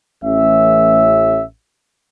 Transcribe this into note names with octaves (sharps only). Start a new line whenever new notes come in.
A1 C#4 E5